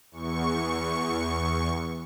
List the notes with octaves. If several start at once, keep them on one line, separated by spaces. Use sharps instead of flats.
E2 C#6